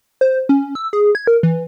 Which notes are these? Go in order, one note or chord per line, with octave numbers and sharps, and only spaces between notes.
C5
C#4
E6
G#4
G#6
A#4
E3